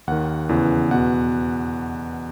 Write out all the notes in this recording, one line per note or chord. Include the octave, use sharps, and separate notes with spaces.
D#2 D#3 F#5
E2 C#3 E3
E2 B2 F#5